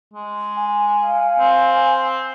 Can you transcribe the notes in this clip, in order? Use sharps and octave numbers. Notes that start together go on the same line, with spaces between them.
G#3
G#5
F5
C4